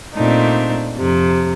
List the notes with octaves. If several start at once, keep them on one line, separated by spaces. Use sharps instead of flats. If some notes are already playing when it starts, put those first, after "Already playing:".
A#2 A3 C4 D4 D#4
F2 C3